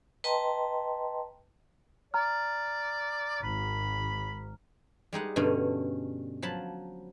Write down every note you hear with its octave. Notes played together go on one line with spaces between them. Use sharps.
B4 D#5 G5 A5 A#5 C6
D5 A#5 F6
G#1 B5
G3 G#3 D#4 F#5
G2 B2 D3 A3 C#4
F3 F#3 A5 B5